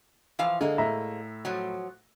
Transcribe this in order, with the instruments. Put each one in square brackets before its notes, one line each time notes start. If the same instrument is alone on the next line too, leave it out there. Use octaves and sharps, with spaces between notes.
[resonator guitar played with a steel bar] E3 F3 F5
[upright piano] D3 [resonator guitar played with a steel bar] G#3 A#3
[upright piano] A2 E5 A#5
[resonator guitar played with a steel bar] F3 F#3